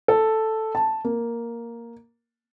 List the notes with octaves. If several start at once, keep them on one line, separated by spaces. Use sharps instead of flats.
A4
A5
A#3